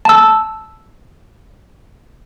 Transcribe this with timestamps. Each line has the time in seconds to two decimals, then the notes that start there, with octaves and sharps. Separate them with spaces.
0.05 A5 E6